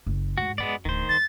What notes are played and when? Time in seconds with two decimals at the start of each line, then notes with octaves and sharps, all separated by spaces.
0.06 F#1
0.38 F2 G#2 F#4
0.58 F#2 G#3 B3 D5
0.85 D1 D#3 C5
1.09 G3 A6